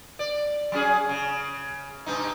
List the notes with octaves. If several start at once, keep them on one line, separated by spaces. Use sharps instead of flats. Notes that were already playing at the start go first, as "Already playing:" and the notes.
D5
F#3 C#4 G#4
C#3
G2 B2 D#4